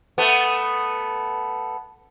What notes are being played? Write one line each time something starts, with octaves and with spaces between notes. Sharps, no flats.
A3 B3